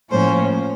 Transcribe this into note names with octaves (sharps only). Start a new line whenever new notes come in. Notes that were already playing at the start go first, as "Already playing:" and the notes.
A2 F3 A#3 C#4 C5